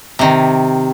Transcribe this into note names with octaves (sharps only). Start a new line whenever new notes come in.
C3 D#3